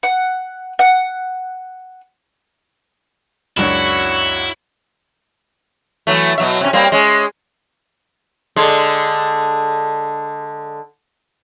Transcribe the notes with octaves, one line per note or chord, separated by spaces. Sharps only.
F#5
F#5
C#2 F#2 D4 E4 F#4 C#5
E3 F#3 A3
B2 F#3 E5
C3 C#4
G3 A#3 C4
G#3 C#4
D3 G#3